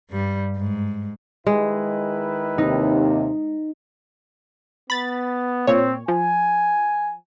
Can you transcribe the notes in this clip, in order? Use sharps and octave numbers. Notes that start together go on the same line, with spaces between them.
G2 G3
G#2
D#3 G#3 E4 B4
D#2 C3 D#4
B3 B5 A6
A#2 C4 C#5
F3 G#5